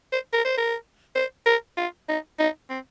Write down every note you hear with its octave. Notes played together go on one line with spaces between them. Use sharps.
C5
A#4
C5
A#4
C5
A#4
F4
D#4
D#4
C4